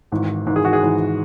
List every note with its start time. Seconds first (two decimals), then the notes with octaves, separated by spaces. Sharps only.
0.12 G#1 G#2 E3
0.46 G#1 G#2 E3
0.56 G#4
0.65 F#4
0.73 G#4
0.82 G#1 G#2 E3